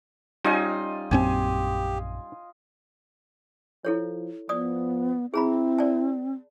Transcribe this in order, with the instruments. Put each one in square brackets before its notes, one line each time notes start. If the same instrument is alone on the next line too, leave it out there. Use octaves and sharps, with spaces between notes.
[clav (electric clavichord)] G3 C#4 D#4 [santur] F4 D#5 G#5
[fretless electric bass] A#1 F#2 C4 [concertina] G4 [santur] G#5
[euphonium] F3 [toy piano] E4 A4 C#5
[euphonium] F3 [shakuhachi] B3 [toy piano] D5 D#6
[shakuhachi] C4 [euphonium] E4 [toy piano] G#4 A#5 B5
[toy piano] D5 A5